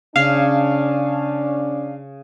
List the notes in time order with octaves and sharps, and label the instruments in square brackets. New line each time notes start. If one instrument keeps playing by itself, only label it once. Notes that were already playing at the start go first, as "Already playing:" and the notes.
[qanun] C#3 [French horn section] C#4 D4 [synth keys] F5